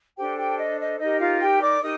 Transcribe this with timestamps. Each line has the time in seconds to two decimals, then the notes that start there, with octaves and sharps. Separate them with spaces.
0.17 D4 G4 A4 C5 G5
0.38 G4 G5
0.58 D#5
0.79 D#5
0.99 D#4 G4 A#4 D#5
1.20 F4 F5
1.40 G4 G5
1.61 D5 D6
1.81 D#4 G4 A#4 D#5 D#6